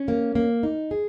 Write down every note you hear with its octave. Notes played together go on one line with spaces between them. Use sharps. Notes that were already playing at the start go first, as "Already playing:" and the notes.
Already playing: C#4
A#3
A#3
D#4
G#4